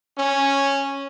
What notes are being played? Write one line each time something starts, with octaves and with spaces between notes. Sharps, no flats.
C#4